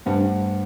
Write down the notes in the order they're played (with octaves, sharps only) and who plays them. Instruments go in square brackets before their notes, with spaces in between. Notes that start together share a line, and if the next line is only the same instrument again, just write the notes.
[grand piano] G2 [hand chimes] A3 D4 G4 C5 F#5